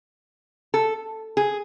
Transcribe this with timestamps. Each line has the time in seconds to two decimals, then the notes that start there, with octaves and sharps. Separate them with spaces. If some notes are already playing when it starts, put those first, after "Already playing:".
0.74 A4
1.37 G#4